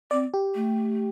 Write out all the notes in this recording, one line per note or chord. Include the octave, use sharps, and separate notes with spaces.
C4 D5
G4
A3